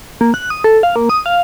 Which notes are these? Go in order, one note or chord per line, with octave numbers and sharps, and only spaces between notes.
A#3
F#6
D#6
A4
F5
A#3
D#6
F5